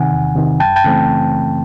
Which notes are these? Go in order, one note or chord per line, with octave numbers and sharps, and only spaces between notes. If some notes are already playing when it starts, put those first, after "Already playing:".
Already playing: C3 D#3 F#5 G#5
E2
C3 D#3
F#2 G5 A5
G5 A5
C#3 E3 A3 C4